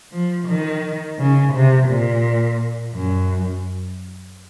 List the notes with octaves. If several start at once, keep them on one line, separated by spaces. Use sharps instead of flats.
F3
D#3
C#3
C3
A#2
F#2